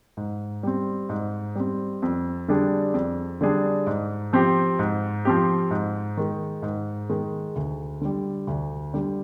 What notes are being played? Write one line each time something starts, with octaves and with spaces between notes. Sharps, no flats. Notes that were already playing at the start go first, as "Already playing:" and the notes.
G#2
G3 C4
G#2
G3 C4
F2
D3 G3 D4 G#4
F2
D3 G3 D4 G#4
G#2
F3 C4 G4
G#2
F3 C4 G4
G#2
D#3 G#3
G#2
D#3 G#3
D2
D3 G3
D2
D3 G3